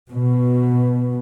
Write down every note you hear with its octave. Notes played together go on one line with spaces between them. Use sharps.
B2